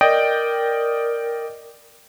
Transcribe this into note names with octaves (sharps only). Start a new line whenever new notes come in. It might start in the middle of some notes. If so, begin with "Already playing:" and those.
A#4 D5 D#5 G5